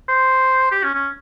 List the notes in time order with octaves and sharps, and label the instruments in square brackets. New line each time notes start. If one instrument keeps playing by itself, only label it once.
[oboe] C5
G4
C#4
C#4